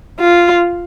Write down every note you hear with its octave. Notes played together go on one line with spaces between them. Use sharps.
F4